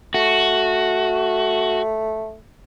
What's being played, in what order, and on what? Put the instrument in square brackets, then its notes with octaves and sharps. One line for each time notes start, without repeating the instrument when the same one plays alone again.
[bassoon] A3 [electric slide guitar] F#4